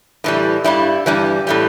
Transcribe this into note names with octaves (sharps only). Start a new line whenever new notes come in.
A2 E3 G3
G2 G3 E4
G2 E3 G3
A2 E3 G3